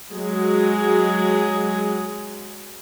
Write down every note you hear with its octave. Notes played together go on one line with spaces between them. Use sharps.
F#3 G#3 G#4